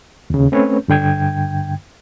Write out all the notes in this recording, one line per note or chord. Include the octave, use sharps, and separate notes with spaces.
D#2 C#3
A3 C4 C#4 B4 C#5
G2 D3 G5 G#6